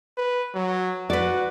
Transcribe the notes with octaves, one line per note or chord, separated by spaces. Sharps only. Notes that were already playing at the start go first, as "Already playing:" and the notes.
B4
F#3
F#4 B4 D5